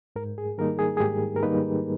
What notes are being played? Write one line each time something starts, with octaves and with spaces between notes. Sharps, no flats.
G#2 A#4
G#4
D#3 G3 A#3 D#4 A#4
G#4
G#4
G#2 G4
A#4
D#3 G3 A#3 D#4 B4